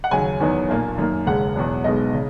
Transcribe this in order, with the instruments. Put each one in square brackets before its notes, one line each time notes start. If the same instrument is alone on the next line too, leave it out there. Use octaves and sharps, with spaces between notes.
[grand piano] F#5
D#2 C#3 F#3 G#5
E2 D#3 F#3 B3
B1 A#2 A#3
F#2 D#3 A#3
E1 D#2 C#3 G#3 F#5
E2 B2 F#3
B1 B2 G#3 B3 D#5
C#3